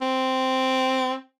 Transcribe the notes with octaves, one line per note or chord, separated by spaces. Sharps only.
C4